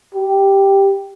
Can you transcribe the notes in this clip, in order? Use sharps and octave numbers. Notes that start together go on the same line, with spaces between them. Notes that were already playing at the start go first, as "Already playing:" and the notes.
G4